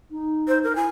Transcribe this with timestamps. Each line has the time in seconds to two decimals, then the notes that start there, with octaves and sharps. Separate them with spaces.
0.11 D#4
0.48 C5
0.63 A#4
0.76 E4 G#5